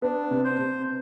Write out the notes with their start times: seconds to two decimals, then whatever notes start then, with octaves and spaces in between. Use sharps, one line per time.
0.02 B3 D4
0.31 C3
0.44 C5
0.59 C3